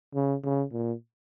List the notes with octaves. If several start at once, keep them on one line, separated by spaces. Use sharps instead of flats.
C#3
C#3
A#2